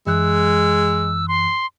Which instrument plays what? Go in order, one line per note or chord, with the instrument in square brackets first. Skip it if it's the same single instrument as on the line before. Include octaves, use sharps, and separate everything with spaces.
[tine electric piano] F#2 E3 F#6 [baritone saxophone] G#3 [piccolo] E6
[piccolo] C6